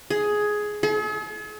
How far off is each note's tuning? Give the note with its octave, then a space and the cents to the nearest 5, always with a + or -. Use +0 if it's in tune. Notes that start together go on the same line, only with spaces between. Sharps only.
G#4 +10
G#4 +45